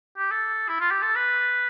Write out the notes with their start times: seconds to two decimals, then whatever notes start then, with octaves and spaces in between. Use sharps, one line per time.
0.17 G4
0.31 A4
0.68 E4
0.80 F4
0.91 G4
1.02 A4
1.15 B4